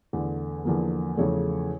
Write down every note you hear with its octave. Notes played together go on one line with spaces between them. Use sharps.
E2 D3 A3
E2 D3 F3 A#3
E2 C#3 F3 A3 C#5